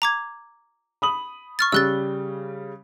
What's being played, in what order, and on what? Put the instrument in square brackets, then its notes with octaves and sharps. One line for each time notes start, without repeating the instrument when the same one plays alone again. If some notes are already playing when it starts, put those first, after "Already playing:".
[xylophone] A#5 D6 G#6
[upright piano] B5 D#6 F#7
[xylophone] C#6 F6 A6
[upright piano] C#3 G3 G7 [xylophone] E6 F#6 A6